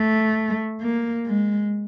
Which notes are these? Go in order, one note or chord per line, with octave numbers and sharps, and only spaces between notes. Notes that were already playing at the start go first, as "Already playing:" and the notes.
Already playing: A3
A#3
G#3